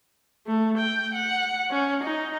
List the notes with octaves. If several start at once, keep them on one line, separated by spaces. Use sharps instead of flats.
A3
G5
F#5
C#4
D#4